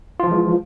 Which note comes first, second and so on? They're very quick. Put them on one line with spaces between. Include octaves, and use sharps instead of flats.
F4 F3 E3 G#3